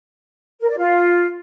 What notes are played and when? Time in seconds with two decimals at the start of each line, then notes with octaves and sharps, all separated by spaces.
0.61 A#4
0.69 D5
0.78 F4